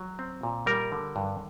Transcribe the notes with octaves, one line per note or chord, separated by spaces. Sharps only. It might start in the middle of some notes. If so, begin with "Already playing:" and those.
Already playing: F#3
C4
A#2
G3 A#4
D3
G2